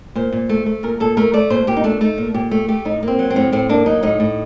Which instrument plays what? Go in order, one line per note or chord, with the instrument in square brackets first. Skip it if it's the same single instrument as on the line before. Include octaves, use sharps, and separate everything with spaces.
[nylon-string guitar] A#2 C5
A#2
A3
A3
A#2 A#4
A#2 A4
A3 A#4
A3 D5
A#2 C5
A#2 G4
D#4
A3 D4
A3 D#4
A#2
A#2 G4
A3 G4
A3 G4
A2 D#4
A#3 C4
F#3
C4
A2
A2 C4
A#3 D4
F#3 D#4
A2 D#4
A2